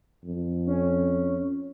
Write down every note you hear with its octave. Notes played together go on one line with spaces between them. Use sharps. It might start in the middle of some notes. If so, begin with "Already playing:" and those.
F2
C#4